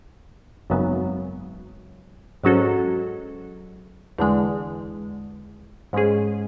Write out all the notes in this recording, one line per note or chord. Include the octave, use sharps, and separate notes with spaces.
G#1 F#2 C#3 F#3 B3
G#2 F#3 C#4 F#4 A4
E2 D3 G#3
G#2 G#3 C#4 G#4